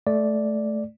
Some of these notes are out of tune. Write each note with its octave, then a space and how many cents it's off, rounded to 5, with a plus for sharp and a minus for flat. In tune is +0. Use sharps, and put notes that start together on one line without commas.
A3 -15 D5 +0